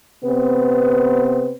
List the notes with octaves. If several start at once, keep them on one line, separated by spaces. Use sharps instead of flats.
C3 B3 C4 B4